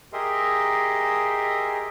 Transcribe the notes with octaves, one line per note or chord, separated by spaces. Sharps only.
G4 G#4 A#4 D#5 E5 C6